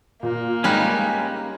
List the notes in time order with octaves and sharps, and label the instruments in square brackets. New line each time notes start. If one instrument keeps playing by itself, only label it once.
[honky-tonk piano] A#2 [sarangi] A#3
[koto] G3 D#4 [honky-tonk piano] G#3 [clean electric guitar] C#4 B4